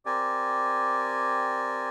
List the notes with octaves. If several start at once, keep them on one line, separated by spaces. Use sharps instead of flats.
C4 G4 A#4 D5 G#5